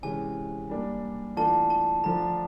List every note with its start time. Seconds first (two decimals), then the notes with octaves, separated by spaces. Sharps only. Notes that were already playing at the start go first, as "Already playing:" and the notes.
0.03 C3 E3 G#3 C#4 G#5
0.69 G3 A#3 D4
1.37 E3 A3 D4 F4 A5
1.70 A5
2.03 D3 F3 A3 D4 A#5